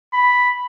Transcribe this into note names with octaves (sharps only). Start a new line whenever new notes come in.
B5